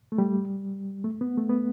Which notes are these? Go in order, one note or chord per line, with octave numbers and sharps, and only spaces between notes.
A3
G3
A3
B3
A3
B3